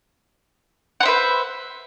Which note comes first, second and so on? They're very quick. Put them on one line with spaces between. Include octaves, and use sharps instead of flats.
F#5 C5 E5 B4